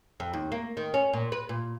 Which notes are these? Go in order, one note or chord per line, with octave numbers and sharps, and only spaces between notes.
F2
D#2
A#3
D#3
C#4
A#2
B4
A#2